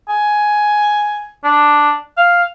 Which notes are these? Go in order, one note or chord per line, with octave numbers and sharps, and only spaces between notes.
G#5
D4
F5